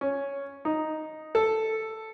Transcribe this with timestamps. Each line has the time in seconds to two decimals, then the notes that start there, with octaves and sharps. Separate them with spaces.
0.01 C#4
0.65 D#4
1.35 A4